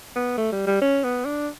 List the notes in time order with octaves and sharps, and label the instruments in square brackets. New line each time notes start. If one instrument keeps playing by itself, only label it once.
[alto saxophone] B3
A3
G3
G3
C#4
B3
D4